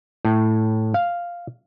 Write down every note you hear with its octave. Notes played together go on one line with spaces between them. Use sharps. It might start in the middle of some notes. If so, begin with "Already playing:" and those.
A2
F5